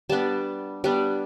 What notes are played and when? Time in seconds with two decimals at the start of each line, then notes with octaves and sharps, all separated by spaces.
0.10 G3 B3 D4 A5
0.84 G3 B3 D4